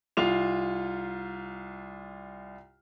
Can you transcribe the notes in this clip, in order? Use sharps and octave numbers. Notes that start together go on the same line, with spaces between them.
C2 F4 F7